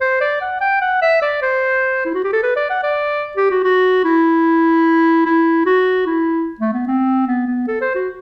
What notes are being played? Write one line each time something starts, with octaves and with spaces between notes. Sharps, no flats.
C5
D5
F#5
G5
F#5
E5
D5
C5
E4
F#4
G4
A4
B4
D5
F#5
D5
G4
F#4
F#4
E4
E4
F#4
E4
A3
B3
C4
B3
B3
A4
C5
F#4